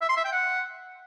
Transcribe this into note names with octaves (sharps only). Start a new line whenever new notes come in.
E5
C6
E5
G5
F#5